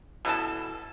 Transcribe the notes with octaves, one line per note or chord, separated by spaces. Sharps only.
B2 E3 A4 A5